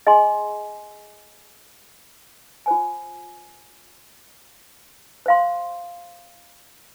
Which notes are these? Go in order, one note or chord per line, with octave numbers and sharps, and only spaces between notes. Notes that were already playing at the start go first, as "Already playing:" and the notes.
G#4 D#5 G#5 C6
F4 C5 G#5
C5 F5 C6